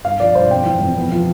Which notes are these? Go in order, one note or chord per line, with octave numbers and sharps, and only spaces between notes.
G2 F5
F3 D5
G2 C5
F2 G5
E3
F2
B3
F3